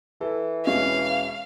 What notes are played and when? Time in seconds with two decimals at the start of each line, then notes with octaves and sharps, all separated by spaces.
0.21 E3 A4
0.65 E1 C#4 D#5 F5